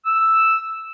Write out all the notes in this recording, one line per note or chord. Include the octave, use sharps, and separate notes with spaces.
E6